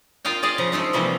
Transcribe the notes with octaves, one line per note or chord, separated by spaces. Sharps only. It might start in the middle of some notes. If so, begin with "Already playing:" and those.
F4 A#4 D#5 F5 G5
G#4 D5 D#5 F5
C#3 F3 A#5
G#3 A3 D#4 F4
C3 E3 F3 G3 A#3 C4